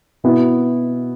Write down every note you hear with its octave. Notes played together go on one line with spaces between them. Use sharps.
B2 B3 E4